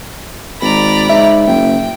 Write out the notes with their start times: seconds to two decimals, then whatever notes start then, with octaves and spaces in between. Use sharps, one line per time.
0.61 G#1 D5 A#5 B5
1.09 G#2 E5
1.47 F#1 G5